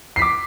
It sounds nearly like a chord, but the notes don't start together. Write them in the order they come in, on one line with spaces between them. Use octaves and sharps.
C7 B6 D6